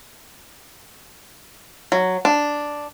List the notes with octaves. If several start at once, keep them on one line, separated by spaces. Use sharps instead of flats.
F#3
D4